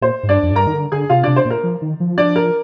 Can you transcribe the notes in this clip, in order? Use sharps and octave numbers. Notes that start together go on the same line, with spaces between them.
A#2 C5
G#2
G2 D4 D5
F2
G#2
G2 A#4 A#5
D#3
D3
D3 G#4 G#5
C3 F4 F5
C3 D4 D5
C5
A#2
A#4
F3
D#3
F3
D4 D5
A#4